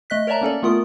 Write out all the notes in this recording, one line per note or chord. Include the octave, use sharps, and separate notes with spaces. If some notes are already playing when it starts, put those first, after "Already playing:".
A3 D#5 F#6 B6
A#4 C#5 D5 E5 A5 A#5
A#3 C#4 A4 D5
A3 B3 F4 A#4 D#6